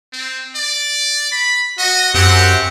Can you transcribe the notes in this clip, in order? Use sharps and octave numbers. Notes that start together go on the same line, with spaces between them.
C4
D5
B5
F#4 D#5
F#2 C4 F#4 G4 F#5